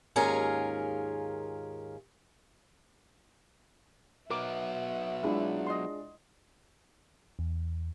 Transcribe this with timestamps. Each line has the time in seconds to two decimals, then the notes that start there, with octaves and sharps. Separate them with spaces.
0.16 D#2 G#2 C#4 F4 G#4 A#4
4.31 F#3 B3 A#4 E5 F#5 D6
5.23 G#3 D4 E4 F4
5.67 D#5 C6
7.39 E2